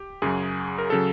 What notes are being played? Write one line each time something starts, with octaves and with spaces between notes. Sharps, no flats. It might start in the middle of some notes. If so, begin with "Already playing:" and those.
Already playing: G4
F#2 C#3 F#3 G#4
A#4
C#3 F#3 A4